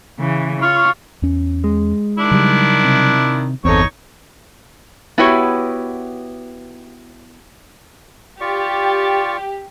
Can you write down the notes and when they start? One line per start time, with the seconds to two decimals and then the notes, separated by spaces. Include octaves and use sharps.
0.19 C#3 E3
0.62 F4 C#5 C#6 F6
1.22 E2 C#4
1.64 G#3
2.18 D#3 D4 E4
2.31 C#3 F#3 G3
2.84 C3
3.65 G1 E2 C4 D#4 A4 C#5 C#6
5.18 B3 E4 F#4 G4 B4 C#5
8.41 F4 G4 D5 C#6